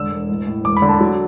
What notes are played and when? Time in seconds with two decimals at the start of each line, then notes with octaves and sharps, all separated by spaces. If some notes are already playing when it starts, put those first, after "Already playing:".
Already playing: E1 D3 E6
0.11 E1
0.30 A1
0.47 A2
0.64 E1 D6
0.77 B5
0.82 D3
0.89 A5
1.01 F#3